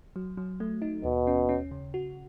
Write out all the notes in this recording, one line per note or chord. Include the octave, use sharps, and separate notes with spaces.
F#3
F#3
A3
D#4
D#2 B2
C#4
C#4
C#3
F#4